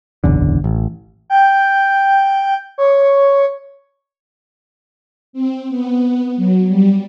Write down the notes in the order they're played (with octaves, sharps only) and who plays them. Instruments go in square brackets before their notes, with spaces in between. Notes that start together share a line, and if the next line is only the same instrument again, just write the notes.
[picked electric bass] F#1 B1 E2 D3
A1
[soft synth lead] G5
C#5
[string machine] C4
B3
F#3
G3